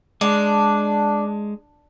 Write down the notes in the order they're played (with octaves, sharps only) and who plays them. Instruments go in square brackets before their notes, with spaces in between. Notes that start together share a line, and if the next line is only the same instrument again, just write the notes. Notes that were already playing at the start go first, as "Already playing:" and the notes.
[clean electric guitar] G#3 [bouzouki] D4